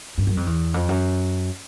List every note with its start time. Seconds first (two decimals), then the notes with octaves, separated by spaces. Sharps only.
0.18 G2
0.27 F#2
0.37 F2
0.47 E2
0.74 F2
0.89 F#2